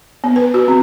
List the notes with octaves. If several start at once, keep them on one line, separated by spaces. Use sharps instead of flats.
B3
B4
F#4
C4